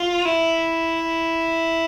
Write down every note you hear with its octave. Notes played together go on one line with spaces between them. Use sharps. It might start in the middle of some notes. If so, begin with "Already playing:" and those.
Already playing: F4
E4